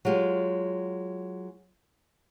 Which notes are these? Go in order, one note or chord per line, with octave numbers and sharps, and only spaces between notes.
F#3 G#3 F4 G4